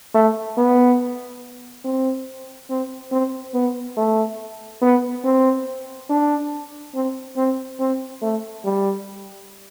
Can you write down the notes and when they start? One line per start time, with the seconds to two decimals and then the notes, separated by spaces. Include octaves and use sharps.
0.14 A3
0.57 B3
1.84 C4
2.70 C4
3.12 C4
3.54 B3
3.97 A3
4.82 B3
5.24 C4
6.09 D4
6.95 C4
7.37 C4
7.79 C4
8.22 A3
8.65 G3